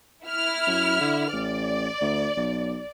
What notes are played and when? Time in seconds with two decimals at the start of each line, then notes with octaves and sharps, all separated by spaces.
0.24 E4 F6
0.67 F#2
1.00 D3
1.33 A1 D5
2.01 D2
2.37 B1